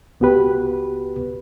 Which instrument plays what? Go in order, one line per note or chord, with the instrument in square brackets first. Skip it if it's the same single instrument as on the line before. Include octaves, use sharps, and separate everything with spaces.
[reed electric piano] C#2 B3 F#4 G4 B4